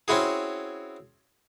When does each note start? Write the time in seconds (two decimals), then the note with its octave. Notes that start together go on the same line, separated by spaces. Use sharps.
0.08 C4 C#4 E4 F#4 G#4